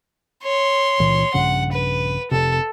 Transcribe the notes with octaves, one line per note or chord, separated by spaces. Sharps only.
C#5 C6
C#2 A#2 E3
A#1 G2 C#3 F#5
B4
F1 C3 A4